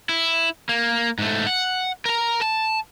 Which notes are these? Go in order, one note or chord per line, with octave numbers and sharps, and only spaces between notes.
E4
A#3
G#2 A3
F#5
A#4 A#5
A5